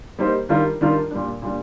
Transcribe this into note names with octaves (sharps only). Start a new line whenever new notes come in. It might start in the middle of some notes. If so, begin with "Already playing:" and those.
G3 A#3 D#4 G4 C5
D#3 G3 D4 F4 A#4
D#3 G3 D4 F4 A#4
A#2 G3 D4
A#2 G3 D4